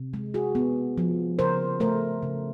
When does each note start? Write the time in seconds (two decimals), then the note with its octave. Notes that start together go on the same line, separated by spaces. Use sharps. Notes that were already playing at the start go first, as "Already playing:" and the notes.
Already playing: C3
0.14 G#3
0.34 F#4 G#4
0.55 B3
0.98 F3
1.39 C#3 A#4 C5
1.80 A3 A#4 C5
2.22 C#3